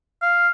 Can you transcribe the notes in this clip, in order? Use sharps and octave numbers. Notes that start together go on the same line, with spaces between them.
F5